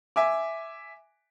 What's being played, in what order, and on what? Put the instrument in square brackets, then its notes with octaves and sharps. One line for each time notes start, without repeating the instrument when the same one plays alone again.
[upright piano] E5 G#5 D6